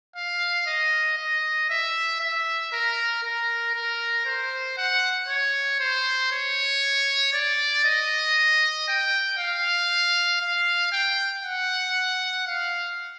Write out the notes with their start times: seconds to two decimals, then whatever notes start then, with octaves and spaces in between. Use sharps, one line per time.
0.16 F5
0.66 D#5
1.18 D#5
1.70 E5
2.21 E5
2.73 A#4
3.23 A#4
3.75 A#4
4.26 C5
4.78 F#5
5.28 C#5
5.80 C5
6.32 C#5
7.33 D5
7.85 D#5
8.88 G5
9.38 F5
10.42 F5
10.92 G5
11.43 F#5
12.47 F5